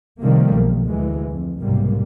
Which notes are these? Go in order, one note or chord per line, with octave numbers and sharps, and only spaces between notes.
C3 D#3 F3 G3 A3 A#3
B1
D2 E3 G#3
F2
B1 G#2 C3 G3 A#3